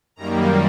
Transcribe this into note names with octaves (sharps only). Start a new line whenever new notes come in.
F#2 D#3 G3 A#3 A#5